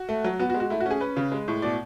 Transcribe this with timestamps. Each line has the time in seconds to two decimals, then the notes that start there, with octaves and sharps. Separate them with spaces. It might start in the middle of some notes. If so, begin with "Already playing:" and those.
Already playing: F#4
0.09 A3
0.24 F#3
0.39 B3 F#4
0.50 F#4
0.54 G#3
0.60 F#4
0.70 A3 E4
0.80 F#4
0.86 C#4 G#4
1.01 C#4 B4
1.16 C#3
1.32 G#3
1.48 A2
1.62 B2 D5